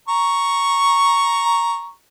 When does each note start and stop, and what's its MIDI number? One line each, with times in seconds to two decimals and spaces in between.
0.08 1.92 82
0.08 1.92 85